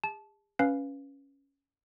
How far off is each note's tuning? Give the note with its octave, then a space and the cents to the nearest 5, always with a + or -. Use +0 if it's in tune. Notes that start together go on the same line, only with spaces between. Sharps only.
G#4 -40 A5 -20
C#4 +0 B4 +0 F5 +0